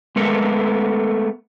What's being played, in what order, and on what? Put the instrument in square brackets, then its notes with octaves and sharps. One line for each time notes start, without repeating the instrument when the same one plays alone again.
[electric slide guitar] G#3 A3 B3 A4 A#4